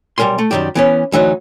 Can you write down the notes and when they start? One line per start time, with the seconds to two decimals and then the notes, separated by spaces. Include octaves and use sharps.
0.18 B1 G3 G#3 A#4 G#5 C6
0.38 A3
0.51 F#2 A2 D#3 G3 G4
0.75 E3 B3 C#4
1.12 D2 E3 F#3 D#4